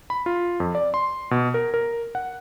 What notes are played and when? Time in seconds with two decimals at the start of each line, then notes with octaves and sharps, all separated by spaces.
0.10 B5
0.26 F4
0.60 F2
0.75 D5
0.94 C6
1.31 B2
1.54 A#4
1.74 A#4
2.15 F#5